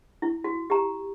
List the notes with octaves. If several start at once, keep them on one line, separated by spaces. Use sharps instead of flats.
E4
F#4
G4 A#5